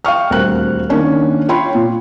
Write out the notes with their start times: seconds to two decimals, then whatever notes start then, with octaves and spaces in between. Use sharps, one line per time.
0.05 F5 G5 C#6 F6
0.30 D#1 D2 C4 A#4 F#6
0.90 D#3 A#3 C#4 D4
1.49 F4 C#5 G5 B5 C6
1.75 A#2